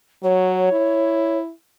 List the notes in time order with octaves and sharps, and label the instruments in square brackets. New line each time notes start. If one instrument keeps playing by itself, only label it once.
[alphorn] F#3 [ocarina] C#5
[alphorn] E4